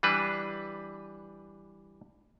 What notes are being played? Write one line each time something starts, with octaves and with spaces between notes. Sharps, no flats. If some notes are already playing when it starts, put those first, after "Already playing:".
E3 G3 D4 B4